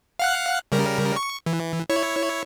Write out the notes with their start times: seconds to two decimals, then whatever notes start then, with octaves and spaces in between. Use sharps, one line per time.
0.19 F5 F#5 F#6
0.72 C#3 G3 A#4
1.16 C#6
1.46 E3
1.90 E4 C#5